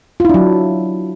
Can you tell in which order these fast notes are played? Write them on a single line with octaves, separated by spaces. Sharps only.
F4 E4 D4 F#3